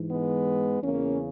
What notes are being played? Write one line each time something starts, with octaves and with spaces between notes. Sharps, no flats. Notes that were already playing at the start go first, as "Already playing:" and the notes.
Already playing: G#2 E3
G#3 B3
E2 C#3 E3 A#3 C#4